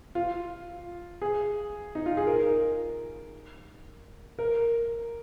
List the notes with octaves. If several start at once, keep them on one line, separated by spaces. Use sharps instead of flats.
F4
G#4
D#4
F4
G#4
A#4
A#4